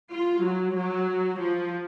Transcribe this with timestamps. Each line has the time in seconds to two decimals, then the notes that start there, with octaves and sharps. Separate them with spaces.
0.12 F4
0.43 F#3
0.76 F#3
1.39 F3